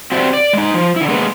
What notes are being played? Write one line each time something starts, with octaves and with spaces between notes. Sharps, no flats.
C4 F#4 G4 C5 D5 E5
D5
G#3 D#4
F3
D3 E4
G#3 A#3 B3